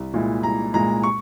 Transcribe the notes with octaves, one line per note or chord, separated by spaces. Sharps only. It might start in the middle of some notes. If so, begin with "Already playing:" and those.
Already playing: C2
A#2 G#3 E4
C2 A#5
A#2 G#3 E4 A#5
C#6